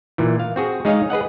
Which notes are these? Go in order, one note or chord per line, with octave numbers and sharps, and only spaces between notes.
A#2 E3
F5
C4 F#4 G#4
G#3 D#4 G#4 C#5 D#5 F5
G#4 B4 D#5 F#5